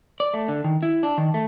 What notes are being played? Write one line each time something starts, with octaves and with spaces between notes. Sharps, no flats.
D5
A3
D3
D#3
E4
D4
D#3
A3